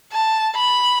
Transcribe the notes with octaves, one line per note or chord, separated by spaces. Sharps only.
A5
B5